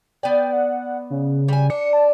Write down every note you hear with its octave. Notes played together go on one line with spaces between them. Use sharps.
B3 D5 G5
F#5
C#3
G3 G#5
D4 C#7
A5